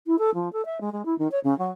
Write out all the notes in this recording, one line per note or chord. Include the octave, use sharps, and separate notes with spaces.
E4
A4
F3
A4
E5
G#3
G#3
E4
D#3
C#5
C#3
F#3